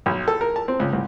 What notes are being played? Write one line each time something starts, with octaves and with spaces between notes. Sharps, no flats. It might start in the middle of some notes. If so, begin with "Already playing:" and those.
B1
A4
A#4
A5
C4
C#2
C2